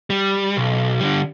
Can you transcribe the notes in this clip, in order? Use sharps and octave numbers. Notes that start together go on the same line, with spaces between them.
G3
B1
D3 G3